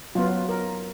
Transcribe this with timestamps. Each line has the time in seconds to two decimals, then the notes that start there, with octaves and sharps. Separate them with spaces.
0.15 F#3 B3 F4
0.49 A#4